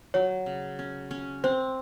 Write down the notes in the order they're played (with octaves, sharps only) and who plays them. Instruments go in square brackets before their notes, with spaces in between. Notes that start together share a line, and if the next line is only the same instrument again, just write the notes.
[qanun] F#3 [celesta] C#5
[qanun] C#3
C#4
C#4
[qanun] C4 [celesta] C5